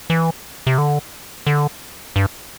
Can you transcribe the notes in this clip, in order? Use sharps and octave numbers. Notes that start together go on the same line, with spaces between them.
E3
C3
D3
D3
G2